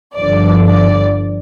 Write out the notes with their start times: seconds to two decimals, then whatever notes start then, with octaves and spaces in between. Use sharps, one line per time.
0.15 G1 G2 D3 F3 D5
0.65 D5